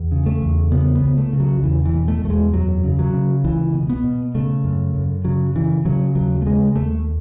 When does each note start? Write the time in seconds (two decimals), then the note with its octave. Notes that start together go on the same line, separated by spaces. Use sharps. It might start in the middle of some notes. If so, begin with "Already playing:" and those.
Already playing: E2
0.12 C#3
0.26 A3
0.42 E2
0.72 C#3 B3
0.95 B3
1.02 C#2
1.18 A3
1.33 C#3
1.40 F#3
1.63 E2 E3
1.85 E3
1.93 B2
2.08 A3
2.23 E2 A3
2.30 G#3
2.53 F#2 F#3
2.84 C#3
2.99 F#3
3.14 C#3
3.44 C#2 E3
3.74 B2
3.89 B3
4.04 B2
4.35 C#3 A3
4.64 F#2
4.94 F#2
5.25 C#3 F#3
5.55 C#3 E3
5.85 C#3 F#3
6.15 D#2 F#3
6.42 A3
6.46 C#3 G#3
6.76 D#2 A3